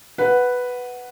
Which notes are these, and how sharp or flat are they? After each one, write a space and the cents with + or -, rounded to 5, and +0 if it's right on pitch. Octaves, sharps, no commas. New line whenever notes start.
B4 +0 F#5 +0